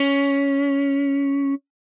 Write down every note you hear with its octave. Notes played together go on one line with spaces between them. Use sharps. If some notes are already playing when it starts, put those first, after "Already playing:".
Already playing: C#4